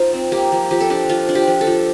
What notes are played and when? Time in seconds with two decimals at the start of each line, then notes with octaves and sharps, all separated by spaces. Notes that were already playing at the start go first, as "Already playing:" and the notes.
Already playing: D#4 F4 C5
0.13 C4
0.32 A#3 G4
0.52 F3
0.71 F3 G4
0.80 A4
0.90 D4 G4
1.09 F3 F4
1.29 D4
1.35 G4
1.47 F3
1.61 A4
1.67 F3